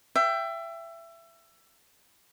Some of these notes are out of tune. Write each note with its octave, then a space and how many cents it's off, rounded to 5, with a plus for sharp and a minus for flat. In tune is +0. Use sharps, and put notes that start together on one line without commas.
E5 +25 G5 +0